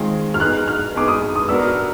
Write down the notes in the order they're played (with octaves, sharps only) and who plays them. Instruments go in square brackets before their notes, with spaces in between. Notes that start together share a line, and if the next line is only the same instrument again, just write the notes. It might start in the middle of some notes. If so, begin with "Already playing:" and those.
Already playing: [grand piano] D#3 G#3 C4 F4 G#4
[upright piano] F6
[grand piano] B3 D#4 G#4 [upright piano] F#6
[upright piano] F6
[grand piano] B3 D#4 G#4 [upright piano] D6
[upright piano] D#6
D#6
[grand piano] B3 D4 F#4 A#4 [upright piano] E6
[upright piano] F6